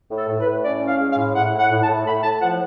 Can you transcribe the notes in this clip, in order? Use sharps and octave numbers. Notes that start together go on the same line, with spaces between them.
A2
A4
A2
B4
A2
C#4 D5
C#4
F5
G#3
F5
A2
A2 F#5
A2
F#5
A2
A5
A2
A2 B5
A2 A5
F3 F#5